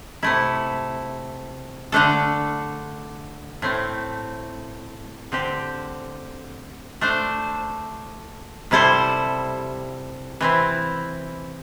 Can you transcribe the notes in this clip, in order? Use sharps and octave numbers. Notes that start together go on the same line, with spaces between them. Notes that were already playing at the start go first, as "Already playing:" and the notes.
C3 A3 E4
D3 A3 D4 A4
A2 A3 C4
D3 C4 G4
A3 D4 C5
C3 G3 E4 A4 C5
E3 C4 E4